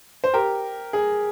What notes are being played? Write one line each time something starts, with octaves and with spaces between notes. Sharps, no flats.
C5
G4 A#4
G#4